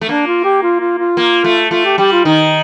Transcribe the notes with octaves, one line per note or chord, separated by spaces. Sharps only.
A3
A#3 D4
F4
G4
F4
F4
F4
A#3
A3
A3 F4
G4
G3 G4
F4
D#3 D#4